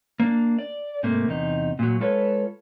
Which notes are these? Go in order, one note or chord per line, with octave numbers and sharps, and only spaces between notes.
A#3 D4
D5
G#2 C3 A3 A#3
E2 C3 D#4
A#2 F#3
G#3 F4 A4 B4 C#5